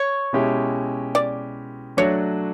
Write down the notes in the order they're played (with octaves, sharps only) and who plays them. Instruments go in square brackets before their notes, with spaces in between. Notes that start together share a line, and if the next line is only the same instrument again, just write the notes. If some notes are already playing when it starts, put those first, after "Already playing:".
Already playing: [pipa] C#5
[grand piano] B2 G#3 C#4 E4 G4
[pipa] D5
[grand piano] F#3 A3 D4 F#4 [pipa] C#5